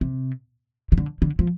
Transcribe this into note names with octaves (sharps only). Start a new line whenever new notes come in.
C3
D#3
D3
D3
F3